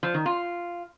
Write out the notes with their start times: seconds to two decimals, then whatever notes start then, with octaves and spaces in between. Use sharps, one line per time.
0.03 F3
0.14 D#3
0.26 F4